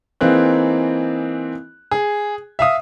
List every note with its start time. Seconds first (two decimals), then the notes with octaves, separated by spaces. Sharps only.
0.21 E3 A#3 C4 D#4 G#4 F#6
1.91 G#4
2.59 E5 F5 D#6